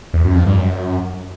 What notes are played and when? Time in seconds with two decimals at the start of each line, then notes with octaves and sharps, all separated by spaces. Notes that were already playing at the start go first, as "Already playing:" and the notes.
0.14 E2
0.24 F#2
0.35 F2
0.46 G2
0.57 F#2